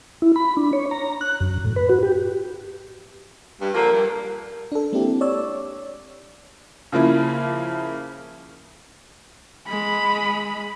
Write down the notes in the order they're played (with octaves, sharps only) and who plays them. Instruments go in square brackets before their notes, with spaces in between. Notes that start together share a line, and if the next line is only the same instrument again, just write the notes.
[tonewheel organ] E4
B5
D4
C#5
A#5
F#6
F#2
A2
B4
F#4
G4
[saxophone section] G2
[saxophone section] D3 F3 A#3 [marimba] A#4
[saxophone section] G2
[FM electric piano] D4 A4
G#3 A#3 C4 D4 E4 G4
C#5 D5 E6
[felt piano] C#3 F3 A#3 E4
[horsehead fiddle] G#3 B5